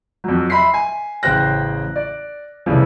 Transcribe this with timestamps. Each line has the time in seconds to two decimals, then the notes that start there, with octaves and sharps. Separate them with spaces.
0.24 F2 F#3
0.50 D#5 E5 B5 C6 B6 C7
0.74 G#5
1.23 A1 C#3 C5 G5 F#6 A#6
1.96 D5
2.66 C2 F2 C#3 E3 F3